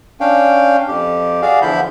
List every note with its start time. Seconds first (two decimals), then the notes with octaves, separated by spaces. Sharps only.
0.20 C#4 D4 F5 G5
0.88 F2 G4
1.42 F#4 G#4 D5 F5
1.62 E2 D3 F3 E4 B5 G6